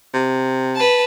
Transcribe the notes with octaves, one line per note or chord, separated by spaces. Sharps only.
C3
B4 A5